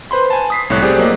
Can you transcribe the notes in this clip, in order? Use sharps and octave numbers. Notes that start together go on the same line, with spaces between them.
B4 C5 B5 C6
G#5 A5
D#6 B6 C7
C2 A2 C#5 F#6
A3 C4 G4 G#4 C5 D5
F#3 A#3 D5 D#5